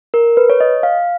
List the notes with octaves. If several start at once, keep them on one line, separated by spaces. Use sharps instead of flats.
A#4
B4
C#5
D#5
F5